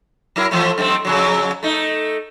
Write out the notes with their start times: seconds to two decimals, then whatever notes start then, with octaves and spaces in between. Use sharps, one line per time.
0.36 F#3 E4 A#4
0.51 E3 F3 A3
0.78 F#2 A3 C4
1.05 F2 C#3 F#3
1.63 A3 D#4